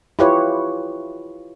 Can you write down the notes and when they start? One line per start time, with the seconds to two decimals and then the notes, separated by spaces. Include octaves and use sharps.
0.19 E4 F4 G4 B4 C#5